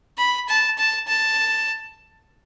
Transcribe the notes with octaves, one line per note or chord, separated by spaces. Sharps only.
B5
A5
A5
A5